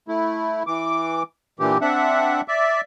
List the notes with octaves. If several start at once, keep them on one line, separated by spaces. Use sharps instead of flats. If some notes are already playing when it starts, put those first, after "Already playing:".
A3 E4
E3 D6
A#2 D3 E3 G4
C4 D4 E5 F#5
D5 E5